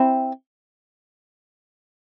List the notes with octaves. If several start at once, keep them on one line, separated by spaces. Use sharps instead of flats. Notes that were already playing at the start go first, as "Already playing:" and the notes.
Already playing: C4 E4